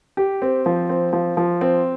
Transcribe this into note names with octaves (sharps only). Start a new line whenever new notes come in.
G4
C4
F3
C4
F3
F3
C4